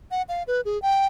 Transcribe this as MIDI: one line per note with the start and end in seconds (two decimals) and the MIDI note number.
0.11 0.22 78
0.29 0.43 77
0.47 0.61 71
0.65 0.80 68
0.82 1.07 79